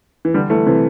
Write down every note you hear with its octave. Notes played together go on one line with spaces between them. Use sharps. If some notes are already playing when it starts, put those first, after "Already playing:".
E3
D3 G3
E3 A3
C3 E3